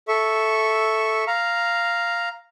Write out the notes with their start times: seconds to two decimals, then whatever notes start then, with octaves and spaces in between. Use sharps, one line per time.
0.08 A4 E5 C#6
1.27 F5 A#5